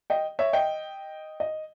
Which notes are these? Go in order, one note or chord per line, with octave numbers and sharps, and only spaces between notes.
D#5 G5
C#5 E5
D#5 G5
D#5